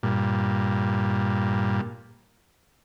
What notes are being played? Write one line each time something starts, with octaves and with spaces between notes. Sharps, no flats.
G2 A#2